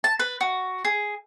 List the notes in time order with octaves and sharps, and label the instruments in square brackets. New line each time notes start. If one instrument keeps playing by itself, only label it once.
[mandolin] A5
B4
F#4
G#4